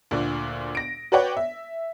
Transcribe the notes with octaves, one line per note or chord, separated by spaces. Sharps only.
D2 A#2 D3
A#6 D7
F#4 B4 C#5 D5 F#5 G5
E5